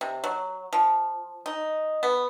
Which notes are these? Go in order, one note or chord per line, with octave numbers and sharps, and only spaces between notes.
C3
F#3
F3
D#4
B3